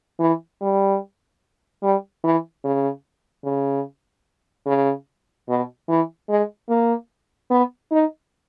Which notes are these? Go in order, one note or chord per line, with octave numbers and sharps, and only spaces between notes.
E3
G3
G3
E3
C#3
C#3
C#3
B2
E3
G#3
A#3
B3
D#4